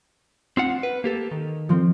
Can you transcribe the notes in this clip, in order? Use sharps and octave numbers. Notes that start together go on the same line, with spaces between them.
C4 F4 F#5
B4
A#3 G4 A4
D#3
F3 C4